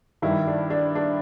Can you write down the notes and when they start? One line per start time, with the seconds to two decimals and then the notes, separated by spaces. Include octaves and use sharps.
0.22 G2 D#3 E4
0.47 D4
0.70 D4
0.95 D4